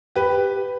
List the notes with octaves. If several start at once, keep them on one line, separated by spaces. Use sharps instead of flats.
G4 B4